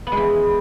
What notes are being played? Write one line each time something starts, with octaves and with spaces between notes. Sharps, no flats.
B3
G#3
E3